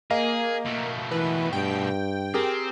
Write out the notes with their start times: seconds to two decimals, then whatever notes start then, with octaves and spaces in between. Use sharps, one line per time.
0.11 A#3 G#4 A#4 D#5 F5
0.66 B2 A3
1.11 E3 B4
1.53 G2 G5
2.34 C4 G4 G#4 A#4